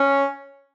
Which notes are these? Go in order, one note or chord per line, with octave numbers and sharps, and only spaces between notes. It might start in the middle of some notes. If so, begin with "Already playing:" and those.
Already playing: C#4